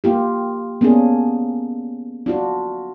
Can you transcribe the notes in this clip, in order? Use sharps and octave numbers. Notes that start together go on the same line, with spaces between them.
A#3 F4 G4
A#3 B3 C#4 D4 G#4
D4 F4 F#4